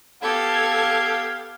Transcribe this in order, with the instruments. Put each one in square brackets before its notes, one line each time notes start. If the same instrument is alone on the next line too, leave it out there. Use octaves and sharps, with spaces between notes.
[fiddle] B3 G4 [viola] A4 [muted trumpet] F5 [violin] G#6